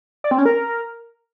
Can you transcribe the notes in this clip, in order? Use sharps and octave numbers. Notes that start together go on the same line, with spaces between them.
D5
C4
C#4
A#4